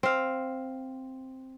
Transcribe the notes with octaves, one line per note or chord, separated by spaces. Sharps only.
C4 F5